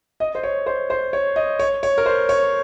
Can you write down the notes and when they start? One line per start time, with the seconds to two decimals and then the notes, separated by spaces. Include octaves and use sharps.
0.20 D#5
0.35 C5
0.44 C#5
0.66 C5
0.90 C5
1.13 C#5
1.36 D#5
1.59 C#5
1.83 C#5
1.98 A#4
2.06 C5
2.29 C#5